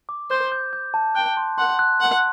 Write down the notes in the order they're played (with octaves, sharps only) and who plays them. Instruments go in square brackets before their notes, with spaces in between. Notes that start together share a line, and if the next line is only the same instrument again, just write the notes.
[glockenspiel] D6
[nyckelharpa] C5 [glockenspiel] G6
[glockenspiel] G6
G6
A5
[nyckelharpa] G5 [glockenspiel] F#6
[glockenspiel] C6
[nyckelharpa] F#5 [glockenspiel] C6
[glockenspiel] F#6
[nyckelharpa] F#5 [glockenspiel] C6